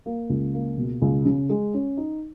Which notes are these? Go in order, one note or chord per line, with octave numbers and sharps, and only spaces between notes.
A#3
C#2
A#3
B2
C#2
C#3
G#3
C#4
D#4